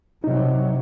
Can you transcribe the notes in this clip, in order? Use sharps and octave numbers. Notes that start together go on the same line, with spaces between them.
C3 F#3 D#4